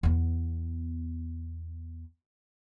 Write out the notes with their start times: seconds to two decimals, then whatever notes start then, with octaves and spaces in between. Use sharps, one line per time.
0.03 E2 B3